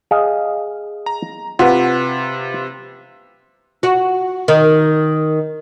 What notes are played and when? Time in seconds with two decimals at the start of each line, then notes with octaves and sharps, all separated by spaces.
0.11 G#4 D#5 F5
1.06 A#5
1.59 C3 F4 B4 F#5
3.83 F#4
4.48 D#3